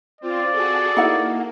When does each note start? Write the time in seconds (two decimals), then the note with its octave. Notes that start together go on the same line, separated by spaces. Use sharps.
0.21 C4 F4 D5
0.52 F#4 G#4 A4
0.97 A#3 D#4 E4 F#5